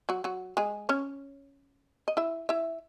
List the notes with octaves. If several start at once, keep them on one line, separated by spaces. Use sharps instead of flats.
F#3 F#4
F#3 F#4
G#3 G#4
C#4 C#5
D#5
E4 E5
E4 E5